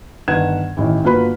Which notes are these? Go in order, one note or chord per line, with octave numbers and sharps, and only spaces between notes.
G1 D#3 B4 F#5 G#6 E7
A1 D#3 E3
G1 A#3 F4 F#4 B4 B5